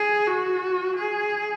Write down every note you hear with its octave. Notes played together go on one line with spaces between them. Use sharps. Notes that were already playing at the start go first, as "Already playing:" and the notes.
Already playing: G#4
F#4
G#4